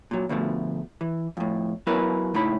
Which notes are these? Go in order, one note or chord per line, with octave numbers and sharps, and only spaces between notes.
A#2 F#3
D2 B2 F3 A3
E3
F2 A2
F#3 B3 E4 A#4 B4
C#2 A2 D#4 E4 B5